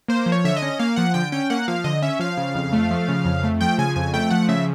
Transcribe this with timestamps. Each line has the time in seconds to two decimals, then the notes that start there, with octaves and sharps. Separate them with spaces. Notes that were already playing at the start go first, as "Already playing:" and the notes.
0.08 A#3 C5
0.26 F3
0.32 C#5
0.44 D3 E5
0.57 D#5
0.62 C#4
0.79 A#3 F5
0.96 F3 F#5
1.14 D3 G5
1.32 C#4 G5
1.50 A#3 F#5
1.68 F3 F5
1.84 D3 D#5
2.02 C#4 E5
2.19 F3 F5
2.37 C#3
2.55 F2
2.73 A3
2.90 F3
3.08 C#3
3.25 F2
3.44 A3
3.61 F3 G5
3.78 C#3 G#5
3.96 F2 G#5
4.14 A3 G5
4.30 F3 F#5
4.48 C#3 E5